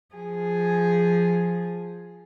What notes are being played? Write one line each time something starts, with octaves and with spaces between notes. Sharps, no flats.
F3 G#4